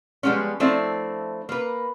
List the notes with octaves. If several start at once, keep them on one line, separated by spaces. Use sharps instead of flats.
F3 G3 G#3 B3 C#4
F3 A3 C4 D4 E4
A#3 B4